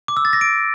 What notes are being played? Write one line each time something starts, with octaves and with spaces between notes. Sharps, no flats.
D6
E6
A6
A#6
D7